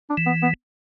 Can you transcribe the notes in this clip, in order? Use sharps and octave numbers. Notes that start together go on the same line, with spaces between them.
D4
E3
B3
B3